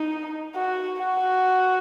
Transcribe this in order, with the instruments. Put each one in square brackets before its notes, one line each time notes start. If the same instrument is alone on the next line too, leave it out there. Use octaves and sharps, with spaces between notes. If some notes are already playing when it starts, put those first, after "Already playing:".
Already playing: [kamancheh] D#4
F#4
F#4